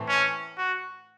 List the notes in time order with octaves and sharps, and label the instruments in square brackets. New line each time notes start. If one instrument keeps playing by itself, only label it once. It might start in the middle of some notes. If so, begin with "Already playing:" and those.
Already playing: [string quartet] A2 E3 A3 C4
[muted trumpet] C#4
F#4